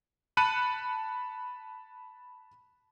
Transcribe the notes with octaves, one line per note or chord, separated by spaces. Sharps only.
A5 B5 F#6 C#7 D#7